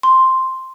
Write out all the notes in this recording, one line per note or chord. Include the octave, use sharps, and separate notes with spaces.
C6